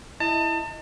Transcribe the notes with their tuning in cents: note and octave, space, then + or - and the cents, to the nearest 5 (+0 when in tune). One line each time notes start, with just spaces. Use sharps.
E4 +0 D#5 +0 A5 +35